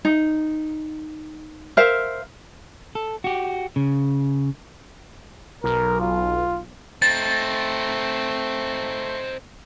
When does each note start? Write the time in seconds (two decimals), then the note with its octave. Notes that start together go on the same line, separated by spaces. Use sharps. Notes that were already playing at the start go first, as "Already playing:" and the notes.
0.05 D#4
1.77 A#4 C5 E5 F5
2.95 A4
3.24 F#4 G4
3.76 C#3
5.64 B1 A#4
6.00 F4
7.02 A3 C4 D#4 A6